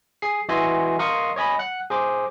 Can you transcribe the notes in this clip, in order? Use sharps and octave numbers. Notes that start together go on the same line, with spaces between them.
G#4 C7
E3 F#4 D#5 E5 G#5 C6
A#4 D#5 F5 C6 C#6 D#6
C#5 D#5 G#5 B5
F#5 F#6
G#4 C5 D6